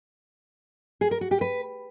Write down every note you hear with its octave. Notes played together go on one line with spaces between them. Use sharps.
G#4
A#4
F#4
G4
B4